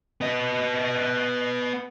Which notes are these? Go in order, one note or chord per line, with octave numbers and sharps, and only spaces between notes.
B3 D#5